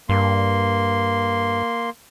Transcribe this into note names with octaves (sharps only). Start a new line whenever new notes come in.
G2 A#3 C6